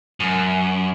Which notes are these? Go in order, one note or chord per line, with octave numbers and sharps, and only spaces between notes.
F#2